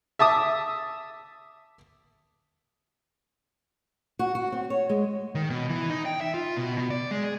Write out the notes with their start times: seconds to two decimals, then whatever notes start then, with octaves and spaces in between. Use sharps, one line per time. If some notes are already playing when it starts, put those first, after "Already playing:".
0.19 E5 A5 D6 D#6
4.19 F#4
4.35 F#4
4.52 C4
4.70 C#5
4.89 G#3
5.35 D#3
5.50 B2
5.69 E3
5.90 D#4
6.06 G5
6.21 E5
6.34 F4
6.56 B2
6.78 B2
6.90 D5
7.11 G#3
7.23 G#4